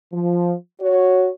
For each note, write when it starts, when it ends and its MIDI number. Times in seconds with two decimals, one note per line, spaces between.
0.12 0.53 53
0.80 1.28 66
0.80 1.28 73